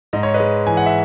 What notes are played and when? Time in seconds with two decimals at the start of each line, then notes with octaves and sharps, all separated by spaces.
0.13 G#2 D#5
0.23 C#5
0.34 B4 D#5
0.40 G#3
0.67 E3 G#5
0.77 F#5
0.86 E5